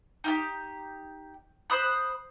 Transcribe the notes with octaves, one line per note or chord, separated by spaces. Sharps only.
D#4 F4 G4
C5 B5 D#6 F#6